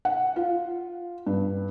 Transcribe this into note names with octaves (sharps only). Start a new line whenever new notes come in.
F#5
F4
G2